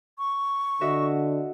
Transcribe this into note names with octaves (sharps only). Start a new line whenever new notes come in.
C#6
D3 F#4 D#5 E5